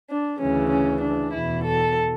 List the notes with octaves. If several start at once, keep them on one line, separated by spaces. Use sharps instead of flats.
D4
D2 C#3 E3 C#4
C#4
D4
E2 B2 E4
A4